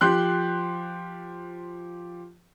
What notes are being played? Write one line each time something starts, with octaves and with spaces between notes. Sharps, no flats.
F3 G4 C6 F#6 G6